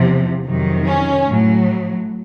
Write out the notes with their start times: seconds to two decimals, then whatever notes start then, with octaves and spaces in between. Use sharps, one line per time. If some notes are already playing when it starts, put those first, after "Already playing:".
Already playing: E2 C3 F3
0.46 F2 C3 D#3 F#3
0.87 C#4
1.28 A2 F#3